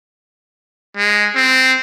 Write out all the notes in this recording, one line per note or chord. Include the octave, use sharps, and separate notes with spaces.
G#3
C4